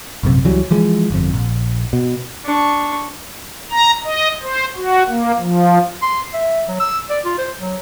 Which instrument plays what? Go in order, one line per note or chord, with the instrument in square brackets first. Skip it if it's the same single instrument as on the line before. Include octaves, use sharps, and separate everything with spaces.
[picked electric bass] A#1 F#2 C3
C#2 E3 F#3 G3
E3 F3 G#3
G1 F2
A#1
B2
[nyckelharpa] D4 C#6
[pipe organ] A#5
D#5
C5
F#4
A#3
F3
[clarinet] C6
E5
F#3
E6
D5
F4
C5
F#3